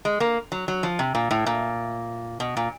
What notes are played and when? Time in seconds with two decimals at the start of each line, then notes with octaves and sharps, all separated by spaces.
0.05 G#3
0.20 A#3
0.52 F#3
0.68 F#3
0.83 F3
0.99 C3
1.15 A#2
1.31 A2
1.46 A#2
2.40 B2
2.57 A#2